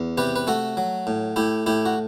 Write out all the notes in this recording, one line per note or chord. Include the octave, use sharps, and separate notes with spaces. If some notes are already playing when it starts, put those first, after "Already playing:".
Already playing: E2
C3 G4 B4
B4
A3 F#4 A4
F#3
A2
A2 E4 G4
A2 E4 G4
F#4